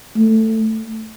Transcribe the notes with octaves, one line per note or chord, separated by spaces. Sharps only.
A3